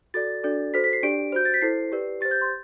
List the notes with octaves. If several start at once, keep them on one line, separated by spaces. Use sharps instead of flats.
F#4 A4 D5 A6
D4 F#4 A4 D5
F#4 A4 C5 B6
B6
C7
D4 G4 D5 D7
F#4 C5 G6
A6
B6
E4 A4 C5 C7
G4 B4 D5
G4 C5 A6
G6
C6